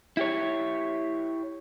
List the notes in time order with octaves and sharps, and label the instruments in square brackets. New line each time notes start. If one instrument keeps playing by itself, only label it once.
[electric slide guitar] E4 G4 C#5